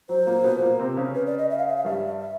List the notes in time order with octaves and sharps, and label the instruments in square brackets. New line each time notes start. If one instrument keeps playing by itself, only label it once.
[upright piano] F#3 [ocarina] C5
[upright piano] A#2 A#3
B2 B3
A#2 A#3
C3 C4
C#3 C#4
[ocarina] B4
D5
D#5
E5
F5
E5
F5
[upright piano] G2 G3 [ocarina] E5
[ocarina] E5